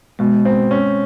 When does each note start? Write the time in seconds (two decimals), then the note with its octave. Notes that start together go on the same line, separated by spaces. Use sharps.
0.19 B2 G#3
0.45 C4
0.71 C#4